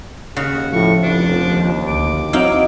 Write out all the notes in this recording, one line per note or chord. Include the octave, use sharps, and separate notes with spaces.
D#2 C#3 F#4
A2 F3 C#6
F1 D4
D#2
D2 D6
F#3 C4 D#4 E4 F5